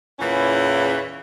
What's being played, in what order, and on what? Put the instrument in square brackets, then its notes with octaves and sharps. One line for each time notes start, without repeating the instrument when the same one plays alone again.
[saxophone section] E2 A#2 C#3 E3 C#4